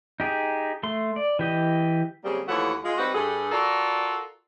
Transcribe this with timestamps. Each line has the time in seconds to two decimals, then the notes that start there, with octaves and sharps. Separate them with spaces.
0.20 D#4 G4 G#4
0.83 A3 C6
1.16 D5
1.39 E3 G4 D#5
2.24 C#3 F#3 G3 A#3 C4 G#4
2.48 D#2 E3 F3 A3 C#5 F#5
2.84 G#3 F4
2.98 G3 C4 D#4 F#4 B4
3.14 G2 G#4 A4
3.52 F4 F#4 A4 A#4 D5